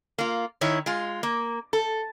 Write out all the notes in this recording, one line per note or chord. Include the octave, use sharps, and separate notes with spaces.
A#3 F4
D#3 E4 C#5
G#3 F4
A#3
A4